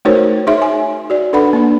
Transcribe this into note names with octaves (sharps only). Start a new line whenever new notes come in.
A3 D#4 F#4 A#4 C5 C#5
D#4 G#4 C#5 E5 C6
G#5
F#4 D5
D4 A4 B4 D5 F#5 B5
A#3 D4